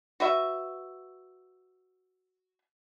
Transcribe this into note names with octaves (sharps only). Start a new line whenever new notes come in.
F#4 B4 E5